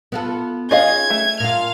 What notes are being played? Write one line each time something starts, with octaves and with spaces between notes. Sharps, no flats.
B3 F4 A4
C#4 D#4 F4 G#4 D#5 F5 G#6
A3
A#2 F4 F5 F6